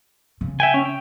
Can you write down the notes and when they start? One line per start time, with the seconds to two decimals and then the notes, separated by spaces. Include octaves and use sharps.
0.41 C#3
0.60 E5 G5 G#5
0.74 C#4
0.85 G5